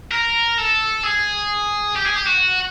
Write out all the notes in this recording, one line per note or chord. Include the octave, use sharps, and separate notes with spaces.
A#4
A4
G#4
G4
G#4
G4
F#4